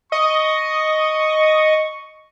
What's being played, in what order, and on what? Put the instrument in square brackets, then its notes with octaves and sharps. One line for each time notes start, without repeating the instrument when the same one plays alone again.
[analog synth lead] D#5 [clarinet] C#6